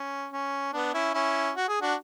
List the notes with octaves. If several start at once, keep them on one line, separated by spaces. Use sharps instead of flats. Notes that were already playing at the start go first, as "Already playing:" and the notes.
Already playing: C#4
C#4
B3 D4
C#4 E4
C#4 E4
F#4
G#4
D4 F#4